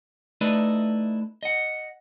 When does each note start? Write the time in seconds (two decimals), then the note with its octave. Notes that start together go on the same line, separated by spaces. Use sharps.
0.41 A3 D#4 E4 B4 D5 D#5
1.43 D#5 F#5